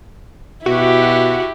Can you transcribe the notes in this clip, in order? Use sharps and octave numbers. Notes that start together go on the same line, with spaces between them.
B2 E4 F#4 G4